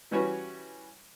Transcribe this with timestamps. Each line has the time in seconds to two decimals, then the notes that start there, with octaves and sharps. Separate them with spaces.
0.11 E3 G3 C#4 F#4 B4 C#5